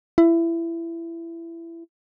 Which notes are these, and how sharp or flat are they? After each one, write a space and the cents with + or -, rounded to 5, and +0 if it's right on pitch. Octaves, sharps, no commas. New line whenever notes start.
E4 +20